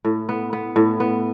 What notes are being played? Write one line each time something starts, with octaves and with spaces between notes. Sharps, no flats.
A2
B3
B3
A2
B3